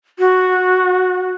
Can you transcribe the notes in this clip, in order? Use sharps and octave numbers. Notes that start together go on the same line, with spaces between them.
F#4